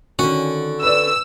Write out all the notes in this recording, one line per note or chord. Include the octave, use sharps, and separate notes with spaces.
D3 D#3 C#4 F#4
B4 D5 E6